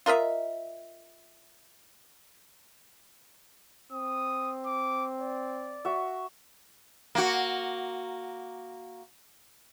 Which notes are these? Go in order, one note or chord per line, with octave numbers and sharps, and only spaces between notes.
F4 A#4 D#5 E5
C4 D#6
D6
D5
F#4 E5
A#3 F#4